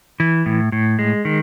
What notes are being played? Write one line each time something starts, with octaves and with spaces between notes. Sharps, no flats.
E3
A2
A2
G#3
D#3